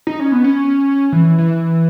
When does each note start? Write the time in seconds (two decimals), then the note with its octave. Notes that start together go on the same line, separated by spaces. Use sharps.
0.07 D#4
0.20 C#4
0.32 B3
0.44 C#4
1.12 E3
1.38 E3